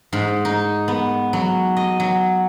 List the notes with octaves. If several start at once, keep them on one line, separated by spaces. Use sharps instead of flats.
G#2
D#4
B3
F#3
D#5
F#3